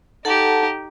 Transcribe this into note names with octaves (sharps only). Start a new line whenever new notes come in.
D#4 G4 A4 F#5 A5